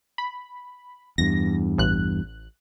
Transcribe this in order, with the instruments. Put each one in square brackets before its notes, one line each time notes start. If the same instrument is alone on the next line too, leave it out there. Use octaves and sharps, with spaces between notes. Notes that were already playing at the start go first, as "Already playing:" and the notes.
[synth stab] B5
[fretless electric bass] E2 G2 [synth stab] A#6
[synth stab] A1 F#6